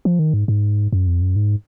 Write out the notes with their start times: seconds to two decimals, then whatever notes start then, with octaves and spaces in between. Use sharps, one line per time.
0.05 F3
0.19 D#3
0.34 G#2
0.48 G#2
0.93 F#2
1.07 F2
1.22 F#2
1.36 G#2